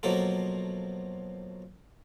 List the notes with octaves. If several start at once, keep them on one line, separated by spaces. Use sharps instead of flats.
B2 F3 F#3 A#3 A4